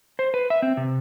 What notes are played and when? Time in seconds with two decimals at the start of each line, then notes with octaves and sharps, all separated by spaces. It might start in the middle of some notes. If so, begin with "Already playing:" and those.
0.19 C5
0.34 B4
0.50 E5
0.62 C4
0.77 C3